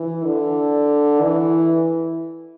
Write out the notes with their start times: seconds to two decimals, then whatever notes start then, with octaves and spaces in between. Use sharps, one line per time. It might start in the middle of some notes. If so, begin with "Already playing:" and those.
Already playing: E3
0.25 D3
1.21 E3